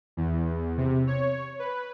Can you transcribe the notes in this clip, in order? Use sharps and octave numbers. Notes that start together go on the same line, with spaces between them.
E2
C3
C#5
B4